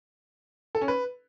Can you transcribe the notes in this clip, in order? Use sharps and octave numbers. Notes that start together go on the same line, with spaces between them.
A4
C#4
B4